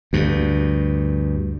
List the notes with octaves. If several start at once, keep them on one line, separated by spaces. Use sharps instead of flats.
D2 G2